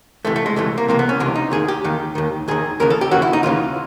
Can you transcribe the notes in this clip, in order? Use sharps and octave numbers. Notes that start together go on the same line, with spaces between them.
C#2 C3 E3 A3
A3
G#3
C#2 C3 E3 A3
A#3
C#2 C3 E3 A#3
B3
C#4
C#2 C3 E3 D4
D#4
D#2 D#3 G#4
G4
D#2 D#3
D#2 D#3
D#2 D#3 G#4
D#2 C#3 E3 A#4
A4
G4
D#2 C#3 E3 F#4
E4
D#4
D#2 C#3 E3 F4